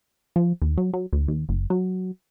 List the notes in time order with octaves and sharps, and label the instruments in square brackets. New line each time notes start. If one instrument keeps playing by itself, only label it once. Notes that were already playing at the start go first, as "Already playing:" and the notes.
[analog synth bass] F3
D#2
F#3
F#3
D2
D#2
F#1
F#3